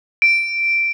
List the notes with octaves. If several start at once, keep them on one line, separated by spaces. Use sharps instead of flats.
D7